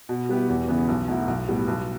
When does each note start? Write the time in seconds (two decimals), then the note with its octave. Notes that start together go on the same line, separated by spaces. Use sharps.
0.09 B2
0.29 G3 B3 E4 G4
0.49 E2
0.68 C#3 E3 B3
0.88 B1
1.08 B2 F#3 A3 E4
1.28 B1
1.48 A2 G3 B3
1.68 B1